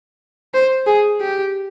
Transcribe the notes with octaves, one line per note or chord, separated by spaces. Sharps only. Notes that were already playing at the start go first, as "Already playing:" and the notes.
C5
G#4
G4